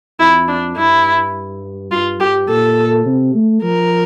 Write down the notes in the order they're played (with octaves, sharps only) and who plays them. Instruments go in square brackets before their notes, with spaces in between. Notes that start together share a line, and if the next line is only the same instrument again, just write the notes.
[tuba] F2 [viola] E4
[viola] D4
[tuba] G2 [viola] E4
[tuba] G2 [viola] F4
[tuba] G2 [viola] G4
[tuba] A#2 [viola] A4
[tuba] C3
A3
[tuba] F3 [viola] A#4